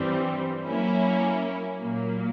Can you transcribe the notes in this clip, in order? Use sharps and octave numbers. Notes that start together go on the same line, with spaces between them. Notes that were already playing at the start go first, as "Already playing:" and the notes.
Already playing: G2 E3 G3 C4
F#3 A#3 C#4 E4
A#2 F#3 A#3